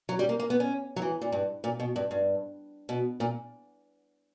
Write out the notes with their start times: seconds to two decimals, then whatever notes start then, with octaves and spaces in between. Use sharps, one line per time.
0.09 F#3
0.19 G3
0.29 A#3
0.39 A#3
0.50 B3
0.60 C#4
0.96 F#3
1.02 E3
1.21 A#2
1.32 G2
1.64 A#2
1.80 B2
1.96 G2
2.11 G2
2.89 B2
3.20 A#2